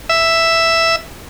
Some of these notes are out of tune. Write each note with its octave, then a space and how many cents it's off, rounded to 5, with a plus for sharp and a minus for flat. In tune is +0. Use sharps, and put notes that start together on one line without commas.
E5 +0